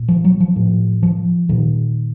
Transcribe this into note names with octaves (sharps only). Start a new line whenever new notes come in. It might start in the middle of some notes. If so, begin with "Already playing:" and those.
Already playing: A#2
F3
F#3
F3
A2
F3
A#2 D#3